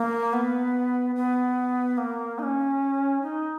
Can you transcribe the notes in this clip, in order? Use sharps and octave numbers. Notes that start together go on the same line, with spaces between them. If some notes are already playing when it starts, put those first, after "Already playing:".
Already playing: A#3
B3
B3
A#3
D#4
C#4
D#4